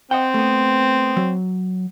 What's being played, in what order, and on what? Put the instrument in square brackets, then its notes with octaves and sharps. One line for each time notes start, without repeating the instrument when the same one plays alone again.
[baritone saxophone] C4 [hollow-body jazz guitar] D#5 F#5 G5
[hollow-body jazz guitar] A3 B3
F#3